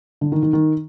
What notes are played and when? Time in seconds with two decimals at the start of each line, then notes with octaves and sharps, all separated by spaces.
0.21 D3
0.32 D#3
0.43 D#3
0.53 D#3